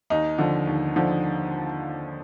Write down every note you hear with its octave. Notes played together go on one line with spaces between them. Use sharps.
D#2 D#4
D3 F3
D#2
D3 F3